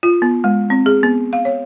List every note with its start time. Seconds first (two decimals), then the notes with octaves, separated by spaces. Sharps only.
0.03 F4
0.22 B3
0.44 G#3
0.70 C4
0.86 G#4
1.03 B3
1.33 F5
1.45 C#5